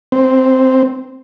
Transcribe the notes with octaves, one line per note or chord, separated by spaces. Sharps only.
C4